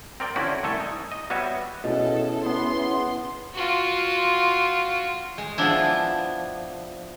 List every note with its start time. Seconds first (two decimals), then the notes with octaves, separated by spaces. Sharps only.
0.20 C4 A#4 D5 G5
0.36 D3 C4 C#4 E4 F#4 D5
0.63 C2 A3 A4 G#5
0.80 D#4
1.12 D#5
1.30 G3 B3 F#4 B4 C#5 E5
1.84 B2 C#4 E4 G#4 A4
2.45 B3 C6
3.54 F4 F#4
5.38 G#3
5.58 F3 B3 D4 E4